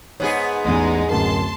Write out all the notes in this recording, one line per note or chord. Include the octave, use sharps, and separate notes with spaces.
G#2 B3 D#4 G#4 C#5
A1 E2 G#3 D#4
D1 F#2 A#4 A5 C6